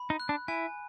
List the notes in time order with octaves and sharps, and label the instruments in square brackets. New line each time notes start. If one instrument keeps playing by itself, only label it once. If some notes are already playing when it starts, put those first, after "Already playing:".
Already playing: [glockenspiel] B5
[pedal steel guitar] D#4
[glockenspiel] F#6
[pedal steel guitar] D4
[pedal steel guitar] E4 [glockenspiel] G#5